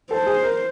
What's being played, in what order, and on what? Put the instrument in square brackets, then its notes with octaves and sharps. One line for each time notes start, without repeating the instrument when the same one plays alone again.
[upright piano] A4 [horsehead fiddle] C5
[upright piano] G#4
A#4